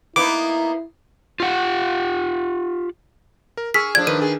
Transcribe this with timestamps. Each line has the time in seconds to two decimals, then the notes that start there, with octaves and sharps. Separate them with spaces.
0.16 A#3 B3 D#4 E4 D6
1.40 F4 G4 F#5
3.57 A#4
3.74 G#4 C#6 E6 F6 B6
3.95 A2 F3 D4 D5 G#6
4.07 D#3 B4 D#7
4.21 G#4